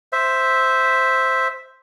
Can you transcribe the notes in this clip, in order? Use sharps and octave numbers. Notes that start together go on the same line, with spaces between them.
C5 E5